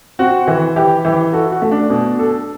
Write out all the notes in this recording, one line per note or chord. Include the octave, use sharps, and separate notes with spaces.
C4 F#4
E3
E3 G4
E3
F#4 A4
F#4
A3
D4
B2
A4